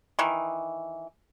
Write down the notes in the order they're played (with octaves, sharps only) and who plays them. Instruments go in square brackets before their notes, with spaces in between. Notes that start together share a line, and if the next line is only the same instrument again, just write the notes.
[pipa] D#3 E3